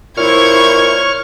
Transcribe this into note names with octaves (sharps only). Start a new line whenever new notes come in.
A#2 E4 C5 C#5 C#6 F6 G#6